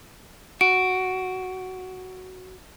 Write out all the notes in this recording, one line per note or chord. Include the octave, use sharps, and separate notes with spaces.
F#4 D7